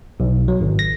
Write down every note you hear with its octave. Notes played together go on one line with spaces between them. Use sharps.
B1
F#3
G#1
A#6